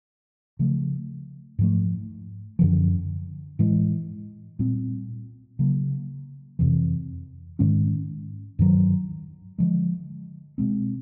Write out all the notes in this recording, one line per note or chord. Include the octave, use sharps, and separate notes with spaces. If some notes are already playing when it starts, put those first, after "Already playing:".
C#3 F3 A3
G#2 F3 A3
F#2 D3 F3
A2 E3 G#3
A#2 G3 C4
C#3 F#3 A#3
F2 C3 E3
G#2 D#3 G#3 C#4
G2 D#3 F#3
D3 F3 G#3
B2 G#3 C4